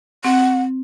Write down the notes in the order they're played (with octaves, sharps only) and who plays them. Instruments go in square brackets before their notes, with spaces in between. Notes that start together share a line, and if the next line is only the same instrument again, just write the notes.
[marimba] C4 [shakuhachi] F#5